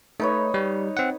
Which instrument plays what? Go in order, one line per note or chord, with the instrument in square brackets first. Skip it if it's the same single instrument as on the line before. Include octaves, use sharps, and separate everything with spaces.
[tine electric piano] A3 [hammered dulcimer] D#4 B4 C#5
[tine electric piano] G3
C4 F#5